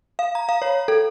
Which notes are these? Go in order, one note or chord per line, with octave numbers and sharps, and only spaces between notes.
F5
A#5
F5
C#5
A4